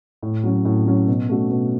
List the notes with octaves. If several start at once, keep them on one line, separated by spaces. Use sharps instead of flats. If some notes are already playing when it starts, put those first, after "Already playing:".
A2
F#3 C#4
A2
F#3 C#4
B2
A3 C#4 F#4
B2